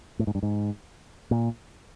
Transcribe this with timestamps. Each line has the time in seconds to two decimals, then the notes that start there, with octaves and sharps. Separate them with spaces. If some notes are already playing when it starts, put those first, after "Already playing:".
0.19 A2
0.27 G#2
0.35 G2
0.43 G#2
1.31 A#2